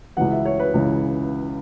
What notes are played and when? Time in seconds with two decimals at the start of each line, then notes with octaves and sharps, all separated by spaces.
0.17 C#2 C#3 E3 F#5
0.31 E5
0.45 C#5
0.59 B4
0.74 C#2 C#3 E3